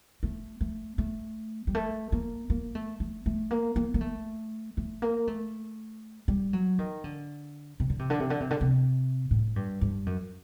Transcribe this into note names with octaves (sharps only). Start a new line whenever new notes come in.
A3
A3
A3
G3
A3
A#3
A#3
A3
A3
A3
A#3
A#3
A#3
A3
A3
A#3
A3
G3
F#3
D#3
D3
C3
D3
C3
D3
C3
D3
C3
D3
C3
A2
G2
G2
F#2